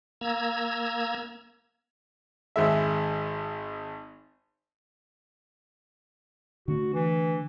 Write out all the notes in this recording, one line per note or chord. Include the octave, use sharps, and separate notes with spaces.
A#3 A#5 E6 G#6
G#1 G#3 E5
D3 A3 D4 F#4
E3